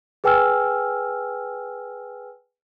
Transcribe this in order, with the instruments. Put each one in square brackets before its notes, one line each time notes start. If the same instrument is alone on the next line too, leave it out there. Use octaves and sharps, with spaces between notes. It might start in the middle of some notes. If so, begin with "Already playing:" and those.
[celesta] G#4 B4 G5 G#5 E6 F6